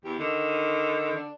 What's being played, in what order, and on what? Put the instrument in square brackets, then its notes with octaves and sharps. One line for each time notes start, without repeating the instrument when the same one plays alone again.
[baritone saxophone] E2 [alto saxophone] G4
[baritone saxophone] D3 [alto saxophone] D#3
[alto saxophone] D4